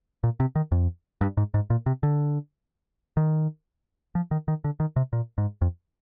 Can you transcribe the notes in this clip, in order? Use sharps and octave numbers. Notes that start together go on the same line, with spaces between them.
A#2
C3
D#3
F2
G2
G#2
G#2
A#2
C3
D3
D#3
F3
D#3
D#3
D3
D#3
C3
A#2
G#2
F2